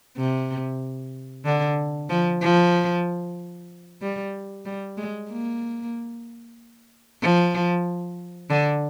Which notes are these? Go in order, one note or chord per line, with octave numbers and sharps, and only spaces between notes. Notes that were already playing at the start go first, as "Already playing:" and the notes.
C3
D3
F3
F3
G3
G3
G#3
A#3
F3
D3